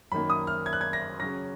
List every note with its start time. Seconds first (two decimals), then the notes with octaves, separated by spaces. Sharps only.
0.12 F#2 D#3 A#3 B5
0.30 D#6
0.47 F6
0.66 G#6
0.73 F#6
0.81 G#6
0.93 A#6
1.20 C#3 F#3 C#4 A#6